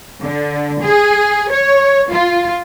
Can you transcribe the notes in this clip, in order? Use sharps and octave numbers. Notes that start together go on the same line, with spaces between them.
D3
G#4
C#5
F4